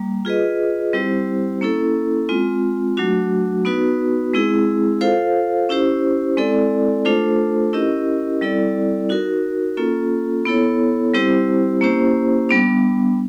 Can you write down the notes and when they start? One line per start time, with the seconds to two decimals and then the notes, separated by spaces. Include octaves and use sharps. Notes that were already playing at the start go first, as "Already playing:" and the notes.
Already playing: G3 A#3
0.25 F4 G#4 B4 D#5
0.93 G3 C4 E4 G4 C5
1.61 A#3 C#4 E4 A4
2.29 G#3 C4 F4
2.97 F#3 A3 D4 F#4
3.65 B3 D#4 F#4 B4
4.33 G#3 C4 E4 G#4
5.01 F4 A4 C5 F5
5.69 C#4 E4 G4 C5
6.37 G#3 C4 E4 A4 D5
7.05 A3 D4 F4 A4 C5
7.73 C#4 E4 G4 A#4 D#5
8.41 G3 C4 E4 A4 D5
9.09 D#4 F#4 A#4
9.77 A#3 C#4 F4 A4
10.45 B3 E4 A4 C#5
11.14 G3 C4 E4 G4 C5
11.81 A#3 C#4 E4 G4 C5
12.49 G3 B3 D4